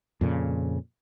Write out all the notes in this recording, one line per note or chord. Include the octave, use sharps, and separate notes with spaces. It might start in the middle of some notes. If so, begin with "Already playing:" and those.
F2 A#2 C#3